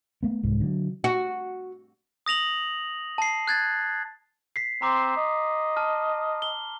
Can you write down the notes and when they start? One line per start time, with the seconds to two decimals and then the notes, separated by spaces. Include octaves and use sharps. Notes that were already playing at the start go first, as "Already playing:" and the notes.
0.23 A3 B3
0.43 C2 G#2
0.60 D3 F#3
1.04 F#4
2.26 D#6 A#6 F7 F#7
3.18 A5 C7
3.48 F#6 G#6 A6
4.56 B6 C7
4.82 C4 A#5 C6 D6
5.17 D#5
5.77 A5 F6
6.42 G7